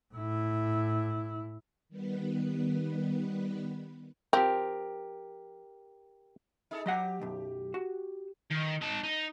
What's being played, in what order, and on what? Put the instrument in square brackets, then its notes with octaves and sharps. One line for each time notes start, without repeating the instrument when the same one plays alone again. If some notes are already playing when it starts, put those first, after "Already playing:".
[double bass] A2 E4
[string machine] D#3 G3 B3 B4
[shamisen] F3 C4 [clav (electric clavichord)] G4 A#4
[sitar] D#4 G#4 A4
[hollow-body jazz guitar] F#3 D#5 F#5 [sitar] G4
[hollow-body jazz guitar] B1 F#2
F#4
[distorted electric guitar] D#3
D#4 A5
D#4